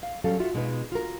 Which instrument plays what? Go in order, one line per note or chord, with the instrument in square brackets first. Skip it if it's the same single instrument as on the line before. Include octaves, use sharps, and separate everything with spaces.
[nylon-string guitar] F5
F#3 G3 C#4 A4 F5
F4 F#4 E5 F#5
B2 G#3 B3 D#4 F4 B4
F4 F#4 A#4